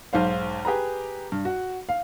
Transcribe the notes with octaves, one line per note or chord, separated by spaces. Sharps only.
B1 G#2 C5 F5
G4 G#4 B4 A#5
G2
F#4
F5